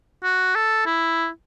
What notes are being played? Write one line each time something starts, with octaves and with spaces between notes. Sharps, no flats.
F#4
A4
E4